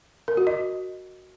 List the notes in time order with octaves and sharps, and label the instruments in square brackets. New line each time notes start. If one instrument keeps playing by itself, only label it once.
[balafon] A#4
F#4
D#5